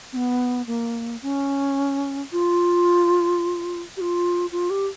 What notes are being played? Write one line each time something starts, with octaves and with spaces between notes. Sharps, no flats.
C4
B3
A#3
C#4
F4
G4
F4
F4
G4